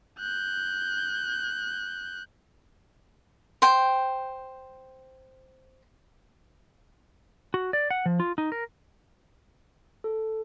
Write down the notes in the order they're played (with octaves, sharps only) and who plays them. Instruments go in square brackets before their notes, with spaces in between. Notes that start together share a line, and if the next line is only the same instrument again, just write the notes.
[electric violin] F#6 G6
[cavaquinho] C5 G5
[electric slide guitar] F#4
D5
F#5
F3
F4
D#4
A#4
[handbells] A4